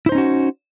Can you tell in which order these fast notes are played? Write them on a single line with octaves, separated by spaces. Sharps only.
E4 C5 D#4 C#4 F#4